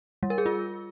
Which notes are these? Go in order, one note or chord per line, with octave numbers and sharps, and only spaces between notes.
G3
A#4
G#4
F4